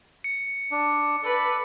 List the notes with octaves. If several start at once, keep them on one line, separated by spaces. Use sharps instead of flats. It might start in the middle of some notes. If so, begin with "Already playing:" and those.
C#7
D4
A4 B4 D5